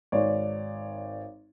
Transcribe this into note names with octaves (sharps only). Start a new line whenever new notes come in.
G#1 C#5 D5